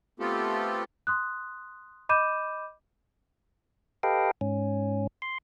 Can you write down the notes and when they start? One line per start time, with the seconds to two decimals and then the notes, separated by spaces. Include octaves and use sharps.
0.20 A3 B3 C4 F4 G4 A4
1.07 C6 D#6 F#6
2.09 D#5 B5 D6 G6 D#7 E7
4.03 G4 A4 B4 D#5 F5 G5
4.41 G#2 C#4
5.22 C6